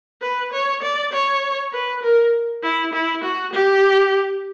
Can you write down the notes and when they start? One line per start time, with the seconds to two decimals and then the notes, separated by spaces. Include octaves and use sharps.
0.21 B4
0.53 C#5
0.83 D5
1.13 C#5
1.73 B4
2.03 A#4
2.63 E4
2.93 E4
3.24 F#4
3.53 G4